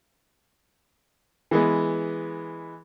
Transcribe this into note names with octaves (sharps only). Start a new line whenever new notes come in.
E3 G#3 B3